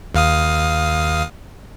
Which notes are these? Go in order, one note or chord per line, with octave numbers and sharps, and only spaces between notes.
D#2 F5 D#6